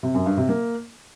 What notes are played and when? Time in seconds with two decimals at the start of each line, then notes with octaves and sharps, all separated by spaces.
0.03 C3
0.14 F#2
0.26 G2
0.37 C3
0.49 A#3